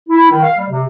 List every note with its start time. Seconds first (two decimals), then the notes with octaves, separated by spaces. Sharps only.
0.08 E4
0.29 D#3
0.42 F5
0.57 G3
0.69 C3